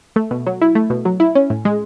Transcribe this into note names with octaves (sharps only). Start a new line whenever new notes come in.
A3
B2
F#3
E4
A3
B2
F#3
E4
C#4
A2
G#3